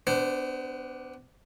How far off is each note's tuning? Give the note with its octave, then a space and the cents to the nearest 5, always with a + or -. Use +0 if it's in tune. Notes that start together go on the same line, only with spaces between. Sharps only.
B3 +30 D4 +0 C5 -5